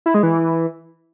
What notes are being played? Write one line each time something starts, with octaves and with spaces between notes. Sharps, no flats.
E4
G#3
E3